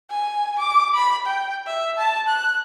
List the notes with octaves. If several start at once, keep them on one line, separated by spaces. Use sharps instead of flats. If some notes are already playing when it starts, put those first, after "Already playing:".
G#5
D6
B5
G5
E5
A5
F#6